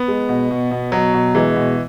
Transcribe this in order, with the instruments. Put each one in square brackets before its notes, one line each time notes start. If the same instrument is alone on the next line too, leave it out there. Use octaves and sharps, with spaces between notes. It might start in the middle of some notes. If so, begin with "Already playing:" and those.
Already playing: [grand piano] B3
[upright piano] G#3
B2
B2
B2
[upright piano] B2 [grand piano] F#3
[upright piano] B2
[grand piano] E3 [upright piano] G#3
[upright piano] B2